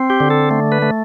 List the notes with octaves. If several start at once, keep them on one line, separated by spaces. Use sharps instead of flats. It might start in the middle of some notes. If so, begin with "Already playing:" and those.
Already playing: C4
G4
D3
A4
A3
B4
A3